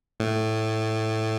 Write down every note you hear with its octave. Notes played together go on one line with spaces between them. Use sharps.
A2